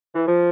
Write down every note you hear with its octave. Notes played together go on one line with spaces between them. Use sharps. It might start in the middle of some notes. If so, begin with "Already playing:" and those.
E3
F3